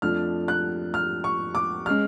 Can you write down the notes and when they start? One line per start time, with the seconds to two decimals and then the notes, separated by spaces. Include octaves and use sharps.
0.02 F2 F3 A3 D4 F6
0.48 F#6
0.94 F6
1.24 C#6
1.55 D6
1.86 G#3 C#4 F6